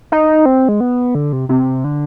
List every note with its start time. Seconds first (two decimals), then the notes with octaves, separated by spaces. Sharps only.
0.12 D#4
0.46 C4
0.69 G#3
0.80 B3
1.15 D3
1.33 C3
1.49 C3
1.84 D3